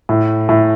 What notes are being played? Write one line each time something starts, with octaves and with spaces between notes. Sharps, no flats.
A2
A2